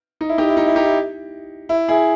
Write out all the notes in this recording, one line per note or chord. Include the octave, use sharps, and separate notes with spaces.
D#4
E4
D#4 G4
E4
D#4
E4
D#4 G4
E4
E4
E4 G#4